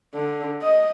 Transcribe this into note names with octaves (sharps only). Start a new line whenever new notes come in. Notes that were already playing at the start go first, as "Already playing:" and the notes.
D3
D#5